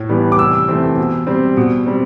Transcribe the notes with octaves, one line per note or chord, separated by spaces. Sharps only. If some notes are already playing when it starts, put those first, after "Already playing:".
Already playing: A2
E3 G3 B3
D6
C3 E6
E3 A3 C4
B2
G3 C4
B2
G3 C4